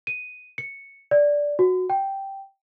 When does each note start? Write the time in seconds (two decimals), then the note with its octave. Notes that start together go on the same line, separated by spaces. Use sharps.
0.07 D#7
0.58 C#7
1.11 D5
1.59 F#4
1.90 G5